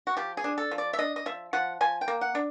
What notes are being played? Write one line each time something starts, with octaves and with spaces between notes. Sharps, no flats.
F#4
F3 G4
G#4
D4
A4
F3
D5
E5
D4 D#5
D#5
F3 E5
F3 F#5
F3 G#5
G5
A#3
F#5
D4